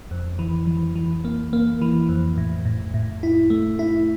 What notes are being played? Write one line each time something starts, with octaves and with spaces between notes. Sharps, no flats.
F2
E3
E3
E3
A#3
A#3
E3
F2
A2
A2
A2
E4
A3
E4